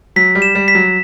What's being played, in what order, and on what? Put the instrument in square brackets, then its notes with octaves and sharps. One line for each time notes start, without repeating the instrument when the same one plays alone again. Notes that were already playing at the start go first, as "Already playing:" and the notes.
[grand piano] F#3 [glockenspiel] B6
[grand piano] G3
[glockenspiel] E7
[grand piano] G3
[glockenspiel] B6
[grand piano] F#3